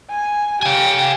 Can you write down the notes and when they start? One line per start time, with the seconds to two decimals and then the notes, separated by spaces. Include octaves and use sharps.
0.10 G#5
0.63 G4 F5 G#5